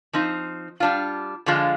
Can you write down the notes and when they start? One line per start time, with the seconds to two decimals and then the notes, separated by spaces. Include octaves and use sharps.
0.13 F3 C4 D#4
0.80 G3 D4 F4
1.46 D3 F3 G#3 D4 F4